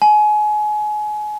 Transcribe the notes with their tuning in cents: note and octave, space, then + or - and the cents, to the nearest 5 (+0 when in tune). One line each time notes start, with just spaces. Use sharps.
G#5 +30